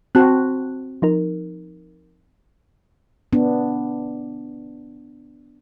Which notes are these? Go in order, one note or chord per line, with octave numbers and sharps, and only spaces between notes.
C4 F#4 A5 F#6
F3 D#4 A#4
B3 D4